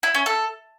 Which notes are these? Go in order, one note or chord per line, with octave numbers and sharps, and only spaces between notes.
E4
C#4
A4